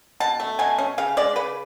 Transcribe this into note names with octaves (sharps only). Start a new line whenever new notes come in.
B2 A5
A3
B2 G#5
C#4
C#3 F5
G#3 D5
C#3 B4